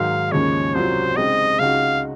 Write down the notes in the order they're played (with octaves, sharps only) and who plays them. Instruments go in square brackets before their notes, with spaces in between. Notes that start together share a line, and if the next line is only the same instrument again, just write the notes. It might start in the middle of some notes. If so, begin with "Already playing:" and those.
Already playing: [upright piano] G#2 D#3 F#3 [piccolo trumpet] F5
[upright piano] D#2 C#3 F3 G#3 C#4 [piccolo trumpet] C#5
[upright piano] C2 C3 F#3 C#4 F4 [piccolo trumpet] C5
[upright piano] C#3 G#3 C4 D#4 [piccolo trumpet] D#5
[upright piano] C#2 C#3 G#3 D#4 F#4 [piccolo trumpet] F5